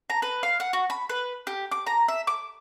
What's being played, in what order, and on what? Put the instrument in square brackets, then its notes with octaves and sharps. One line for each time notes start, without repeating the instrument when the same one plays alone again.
[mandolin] A#5
B4
F5
F#5
F#4
B5
B4
G4
D6
A#5
E5
D6